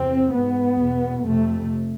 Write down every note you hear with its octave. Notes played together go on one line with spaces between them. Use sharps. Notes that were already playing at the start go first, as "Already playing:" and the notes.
Already playing: E2 C3 C4
G#2 B3
E2 B2
F2 C3 A3